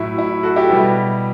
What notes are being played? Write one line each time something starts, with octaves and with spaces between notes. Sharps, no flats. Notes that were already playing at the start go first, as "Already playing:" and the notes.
Already playing: A2 F#3 E4
E4
F#4 A4
E4 G4
B2 G3